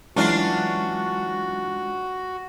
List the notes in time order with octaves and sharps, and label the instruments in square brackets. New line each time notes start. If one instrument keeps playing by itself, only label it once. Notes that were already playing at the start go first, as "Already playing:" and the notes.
[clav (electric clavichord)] E3 F#3 [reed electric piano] G#3 [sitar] C#4 D4 F4 [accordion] F#4